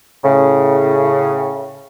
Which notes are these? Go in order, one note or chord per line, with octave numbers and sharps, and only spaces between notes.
A2 C#3